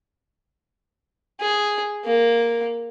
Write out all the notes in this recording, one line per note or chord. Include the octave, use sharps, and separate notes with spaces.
G#4
A#3